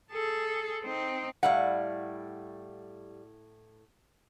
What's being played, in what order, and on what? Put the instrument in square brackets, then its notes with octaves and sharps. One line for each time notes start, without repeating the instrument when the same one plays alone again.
[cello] G#4 A4
C4 D#4
[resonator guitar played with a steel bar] A2 E4 F#5 [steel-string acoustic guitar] G3 F5